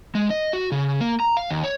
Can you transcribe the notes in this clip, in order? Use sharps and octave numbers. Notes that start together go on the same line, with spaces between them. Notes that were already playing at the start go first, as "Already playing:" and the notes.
G#3
D#5
F#4
C#3
A#3
A#5
F5
D#2
C#5